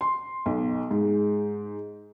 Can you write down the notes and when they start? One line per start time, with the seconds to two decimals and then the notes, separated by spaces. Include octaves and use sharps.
0.01 C6
0.46 B1
0.91 G#2